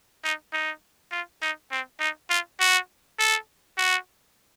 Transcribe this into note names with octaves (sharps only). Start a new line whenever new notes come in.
D#4
D#4
F4
D#4
C4
D#4
F4
F#4
A4
F#4